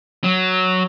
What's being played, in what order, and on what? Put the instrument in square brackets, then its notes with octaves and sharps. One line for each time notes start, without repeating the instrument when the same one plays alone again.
[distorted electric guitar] F#3